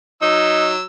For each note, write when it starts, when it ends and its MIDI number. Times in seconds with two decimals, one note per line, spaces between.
0.22 0.83 54
0.22 0.73 63
0.22 0.83 88